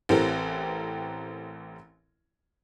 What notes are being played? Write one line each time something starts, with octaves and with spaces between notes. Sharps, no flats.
A1 E3 C4 G4 A4 A#4